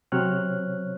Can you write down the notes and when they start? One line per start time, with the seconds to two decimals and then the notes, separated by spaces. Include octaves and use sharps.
0.12 C3 F#3 C4 C#5 F6 F#6